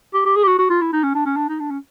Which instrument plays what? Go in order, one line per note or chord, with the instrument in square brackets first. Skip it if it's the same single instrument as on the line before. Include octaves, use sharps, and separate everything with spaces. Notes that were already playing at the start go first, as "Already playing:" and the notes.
[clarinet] G4
G4
G#4
G4
F#4
F#4
F4
E4
D#4
C#4
D4
C#4
D4
D#4
D4
C#4